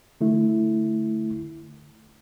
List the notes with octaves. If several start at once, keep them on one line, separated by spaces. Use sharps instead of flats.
D3 A3 E4